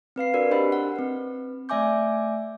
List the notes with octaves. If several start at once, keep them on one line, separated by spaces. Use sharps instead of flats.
C4 B4 F5 C7
D4 F#4 A#4 B4 D5
D4 G4 C5 D#5 F#5 B5
F#5
C4 B4
A3 D5 E5 G#5 D6 G6